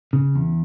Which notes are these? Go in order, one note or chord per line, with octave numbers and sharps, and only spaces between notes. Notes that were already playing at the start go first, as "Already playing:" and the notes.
C#3
E2